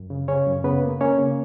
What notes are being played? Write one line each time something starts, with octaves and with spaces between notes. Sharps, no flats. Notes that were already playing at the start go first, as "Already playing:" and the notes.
Already playing: F#2
C#3
C#3 C#4 C#5
F#2
C#3 B3 B4
A#3
A#3 C#4 C#5
C#3